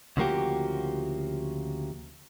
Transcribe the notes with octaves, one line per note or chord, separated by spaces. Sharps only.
D2 C#3 F3 A#3 F#4 G4